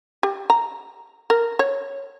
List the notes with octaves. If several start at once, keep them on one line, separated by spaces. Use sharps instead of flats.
G4
A#5
A#4
C#5